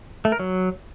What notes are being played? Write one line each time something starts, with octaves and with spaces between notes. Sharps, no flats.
A3
A#4
F#3